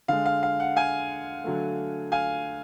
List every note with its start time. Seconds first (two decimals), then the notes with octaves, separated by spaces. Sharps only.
0.08 D3 G#3 F5
0.26 F5
0.43 F5
0.60 F#5
0.76 F5 G#5
1.44 D3 F#3 A3
2.12 F5 G#5